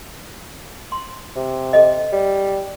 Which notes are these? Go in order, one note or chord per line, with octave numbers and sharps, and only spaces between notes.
C6
C3
A4 D#5
G3